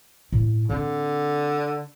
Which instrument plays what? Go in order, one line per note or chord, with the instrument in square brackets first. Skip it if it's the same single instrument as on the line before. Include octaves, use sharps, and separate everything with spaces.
[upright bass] A2
[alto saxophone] D3 [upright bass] C4